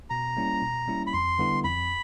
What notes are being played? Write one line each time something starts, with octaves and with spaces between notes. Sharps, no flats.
B2 A#5
G3 A#3 C#4 E4
B2
G3 A#3 C#4 E4
B5
F2 C6
D3 G3 B3 E4
F2 B5